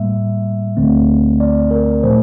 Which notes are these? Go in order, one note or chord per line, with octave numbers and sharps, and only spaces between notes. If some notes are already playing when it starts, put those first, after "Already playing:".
Already playing: A2 G3 A#3 E5
D2 D3 A3 C4
D5
A#4
A#2 F3 A3 C5